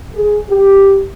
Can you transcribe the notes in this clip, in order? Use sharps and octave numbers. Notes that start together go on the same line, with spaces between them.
G#4
G4